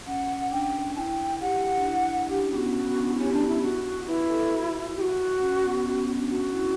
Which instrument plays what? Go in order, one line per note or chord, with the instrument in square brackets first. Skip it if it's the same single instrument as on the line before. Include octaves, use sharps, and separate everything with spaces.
[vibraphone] C#4 [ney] F#5
[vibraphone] D4 [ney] G5
[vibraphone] E4 [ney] G5 A5
[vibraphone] G4 [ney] F#5
[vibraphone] D4
E4
[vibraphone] D4 [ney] G4
[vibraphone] C#4
[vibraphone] B3 [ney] G4
[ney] F#4
[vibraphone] C#4
C#4
B3
D4
E4
[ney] C#4 [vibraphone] G4
[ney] D4
E4
F#4
[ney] E4 [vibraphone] B4
[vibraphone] A4
F#4
[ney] G4
F#4
[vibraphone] C#4
B3
C#4
B3
C#4
D4
[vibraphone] C#4 [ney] F#4
[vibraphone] E4